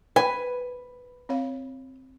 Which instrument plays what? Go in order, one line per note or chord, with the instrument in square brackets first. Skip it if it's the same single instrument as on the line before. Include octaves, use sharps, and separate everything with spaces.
[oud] B4 [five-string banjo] G#5
[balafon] C4 C#5 F5